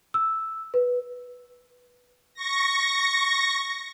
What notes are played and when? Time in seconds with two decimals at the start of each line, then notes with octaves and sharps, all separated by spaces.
0.14 E6
0.74 B4
2.35 C#6 A#6